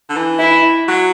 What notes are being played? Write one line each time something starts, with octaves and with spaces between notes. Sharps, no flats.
D3
E3
E4
F#3